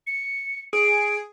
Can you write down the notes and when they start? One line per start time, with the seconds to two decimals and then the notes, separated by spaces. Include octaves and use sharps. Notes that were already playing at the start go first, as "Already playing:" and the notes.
0.07 C#7
0.73 G#4 D7